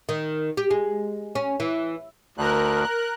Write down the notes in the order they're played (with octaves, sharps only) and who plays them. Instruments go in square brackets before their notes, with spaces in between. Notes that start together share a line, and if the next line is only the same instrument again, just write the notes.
[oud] D#3
G4
G#3
C#4
E3
[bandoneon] D2 [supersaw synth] A#4 F#6